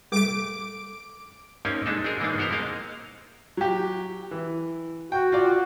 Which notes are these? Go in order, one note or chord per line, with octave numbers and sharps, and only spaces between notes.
C2 A3 D6 D7
A#3 C4 C#4 D#4 G4 A#4
G#3 D4 D#4 A4
C4 D4 F#4 G#4 A#4
E3 G#3 A#3 C4 D4 D#4
B3 F#4 A#4 C5 A#5
G#3 A#3 C4 A#4 D#5 F5
F#3 G4
E3
F#4 G5
F4 D5